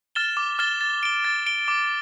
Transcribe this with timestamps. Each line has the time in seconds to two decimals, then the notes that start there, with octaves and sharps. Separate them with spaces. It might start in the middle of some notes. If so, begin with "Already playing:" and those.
0.15 F6 A6 E7 G7
0.37 D6
0.59 F6 A6 E7 G7
0.81 A6
1.03 D7 G7
1.25 A6
1.46 D7 G7
1.68 D6